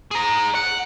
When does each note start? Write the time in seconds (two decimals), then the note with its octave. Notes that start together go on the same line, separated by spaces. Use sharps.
0.11 G#4 A#5
0.55 F#5